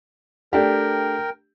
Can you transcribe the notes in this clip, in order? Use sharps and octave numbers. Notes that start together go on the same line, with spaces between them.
A3 D4 G4 A#4 G5